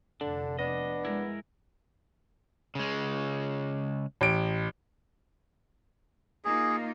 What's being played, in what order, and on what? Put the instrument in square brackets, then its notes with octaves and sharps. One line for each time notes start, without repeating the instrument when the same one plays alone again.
[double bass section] F1 [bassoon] D3 [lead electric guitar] D4
[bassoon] B3 [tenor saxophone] D4 [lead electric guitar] D#5
[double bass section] G#3 [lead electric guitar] E4 A#4
[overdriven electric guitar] C#3 G#3
[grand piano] A1 D7
[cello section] A#3 D#4 F4 [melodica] G#4